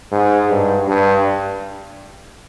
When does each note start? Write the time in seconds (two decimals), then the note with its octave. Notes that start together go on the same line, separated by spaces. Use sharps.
0.12 G#2
0.49 G2
0.88 G2